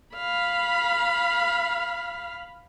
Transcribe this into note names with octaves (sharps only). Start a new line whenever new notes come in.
F5 B5